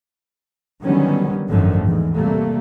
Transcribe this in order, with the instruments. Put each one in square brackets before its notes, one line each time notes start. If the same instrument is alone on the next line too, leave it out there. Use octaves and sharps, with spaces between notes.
[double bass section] D3 D#3 F#3 G3 B3 C#4
G#1 F#2 D3 D#3 F3 A3
E2 G#2
C3 G3 A3 A#3